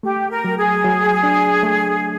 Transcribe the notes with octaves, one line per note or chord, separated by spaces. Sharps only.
A3 G4
A#4
F#3
G#4
F#3
D4
A3